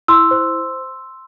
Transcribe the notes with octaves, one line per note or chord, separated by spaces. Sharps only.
E4 C6 E6
C5